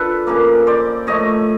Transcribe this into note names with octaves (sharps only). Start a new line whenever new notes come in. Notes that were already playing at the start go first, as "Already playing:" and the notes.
Already playing: D4 F4 A4 B4
C#3 F3 A#3
C5 D5
A2 F3 A3 C#5 D#5